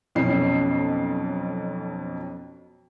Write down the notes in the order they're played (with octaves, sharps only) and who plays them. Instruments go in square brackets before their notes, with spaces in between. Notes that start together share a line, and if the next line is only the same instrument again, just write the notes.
[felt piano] B1 F2 B2 C#4 C7